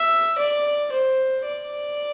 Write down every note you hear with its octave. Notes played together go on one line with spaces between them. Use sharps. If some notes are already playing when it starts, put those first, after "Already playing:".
Already playing: E5
D5
C5
D5